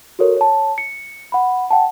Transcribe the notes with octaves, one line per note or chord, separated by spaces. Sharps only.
F#4 A4 A#4 C#5
C#5 A5
C#7
F#5 B5
F#5 G5 A5